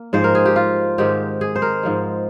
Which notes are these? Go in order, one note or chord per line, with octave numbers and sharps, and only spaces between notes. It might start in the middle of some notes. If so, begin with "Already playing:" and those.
Already playing: A#3
G#2 F3 G#3 C5
A#4
G#4
G4
F4
G#2 D#3 G#3 C4 G4
G#4
C5
A#4
G#2 F3 G#3